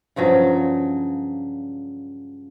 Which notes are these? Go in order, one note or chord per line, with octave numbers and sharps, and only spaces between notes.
G2 C#3 F3 F#3